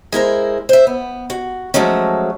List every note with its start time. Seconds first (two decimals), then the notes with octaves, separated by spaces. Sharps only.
0.12 G#3 E4 A#4 C5
0.69 C5 E5
0.87 B3
1.30 F#4
1.74 F3 F#3 G#3 A3 C#4